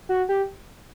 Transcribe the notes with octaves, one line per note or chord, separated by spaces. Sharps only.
F#4
G4